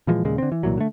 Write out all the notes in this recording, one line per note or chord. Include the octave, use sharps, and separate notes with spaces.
A#2 E3 F3 G#3
D#2 A#2 C#3 G#3
D3 C4
E3
C2 A#2 E3 F#3
D3 A3